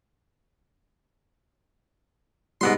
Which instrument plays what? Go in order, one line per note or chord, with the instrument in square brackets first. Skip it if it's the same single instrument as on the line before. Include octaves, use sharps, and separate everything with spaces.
[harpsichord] G#2 B3 C6 [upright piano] G3